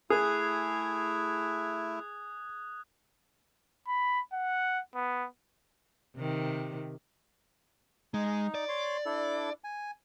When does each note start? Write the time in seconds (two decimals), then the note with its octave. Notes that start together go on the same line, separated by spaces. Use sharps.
0.10 A3 E4 G#4 D#6 F#6 G#6
3.87 B5
4.33 F#5
4.95 B3
6.16 C3 D#3
8.14 G#3 D#4
8.55 D5
8.69 C#5 C6
9.06 D4 E4 A4
9.64 G#5